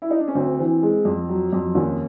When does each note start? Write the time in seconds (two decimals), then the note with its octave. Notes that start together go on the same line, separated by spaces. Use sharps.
0.02 E4
0.10 D#4
0.19 D4
0.28 C#4
0.35 D2 C4
0.59 E3
0.82 G#3
1.05 F2
1.29 F#3
1.53 F2
1.75 D#2 C#4